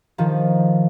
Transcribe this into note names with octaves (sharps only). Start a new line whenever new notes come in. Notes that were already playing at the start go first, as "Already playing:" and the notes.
D#3 F3